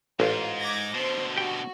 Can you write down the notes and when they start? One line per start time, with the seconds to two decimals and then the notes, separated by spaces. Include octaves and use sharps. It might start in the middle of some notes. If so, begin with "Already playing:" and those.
0.20 A1 G#2 F4
0.60 D6 G#6 A#6
0.94 B2 D3 C5 C6
1.36 F#4 G4 G5